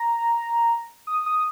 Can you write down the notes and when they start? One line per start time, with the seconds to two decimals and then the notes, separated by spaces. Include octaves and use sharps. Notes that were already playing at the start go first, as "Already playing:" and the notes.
Already playing: A#5
1.07 D#6
1.26 D#6